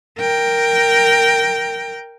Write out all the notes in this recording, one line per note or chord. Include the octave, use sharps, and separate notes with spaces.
A#4 G5